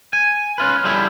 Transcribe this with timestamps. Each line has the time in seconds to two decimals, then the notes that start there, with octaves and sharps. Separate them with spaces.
0.13 G#5
0.58 C#4 F4 B4
0.84 D3 G3 E4 G#4 E5